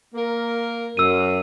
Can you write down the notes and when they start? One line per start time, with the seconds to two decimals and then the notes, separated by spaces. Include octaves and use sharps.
0.15 A#3 A#4
0.97 F#2 E6 D#7